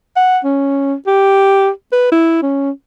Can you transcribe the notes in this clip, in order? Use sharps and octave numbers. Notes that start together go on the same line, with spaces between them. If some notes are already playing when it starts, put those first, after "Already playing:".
F#5
C#4
G4
B4
E4
C#4